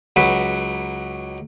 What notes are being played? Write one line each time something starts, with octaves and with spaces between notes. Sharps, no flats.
C#2 F#3 B4